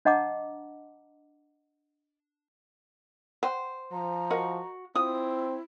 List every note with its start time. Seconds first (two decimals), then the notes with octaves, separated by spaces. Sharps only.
0.05 D4 D#5 F#5 A5 A#5 D6
3.43 C5 F#5 G5
3.92 F3 A#5
4.30 F#4 A#4 D#5 F#5
4.95 C4 E4 F4 D#6